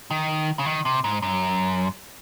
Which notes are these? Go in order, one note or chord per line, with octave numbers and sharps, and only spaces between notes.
D#3
C#3
D#3
C3
G#2
F#2